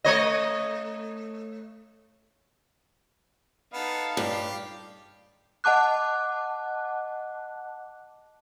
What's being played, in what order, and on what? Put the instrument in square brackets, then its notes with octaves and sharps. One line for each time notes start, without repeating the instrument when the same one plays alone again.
[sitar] A3 C#5 D#5
[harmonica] B3 [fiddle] D#4 A4 [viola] F5
[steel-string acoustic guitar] G2 [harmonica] G4
[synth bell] D#5 F#5 A5 D6 F#6